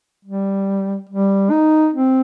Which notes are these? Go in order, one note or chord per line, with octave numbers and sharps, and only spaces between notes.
G3
G3
D#4
C4